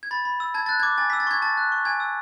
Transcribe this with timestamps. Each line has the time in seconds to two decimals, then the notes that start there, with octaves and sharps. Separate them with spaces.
0.03 G#6
0.11 B5 A6
0.25 B5
0.40 E6
0.54 A5 G#6
0.66 F#6 A6
0.80 D6 G#6
0.98 G#5 A6
1.10 B6
1.13 E6
1.20 A6
1.27 C#6 G#6
1.42 A5 A6
1.57 F#6
1.72 C#6
1.85 G#5 G#6
2.00 E6